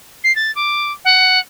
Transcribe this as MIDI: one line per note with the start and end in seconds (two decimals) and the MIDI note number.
0.23 0.34 96
0.35 0.53 93
0.55 0.92 86
1.04 1.39 78